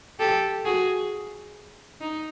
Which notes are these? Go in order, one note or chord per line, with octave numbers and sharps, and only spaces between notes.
G4 A4
F#4 G#4
D#4